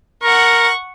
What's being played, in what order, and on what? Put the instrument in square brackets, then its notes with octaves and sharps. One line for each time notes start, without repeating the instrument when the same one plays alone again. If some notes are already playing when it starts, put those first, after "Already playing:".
[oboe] A#4 [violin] F#5 C#6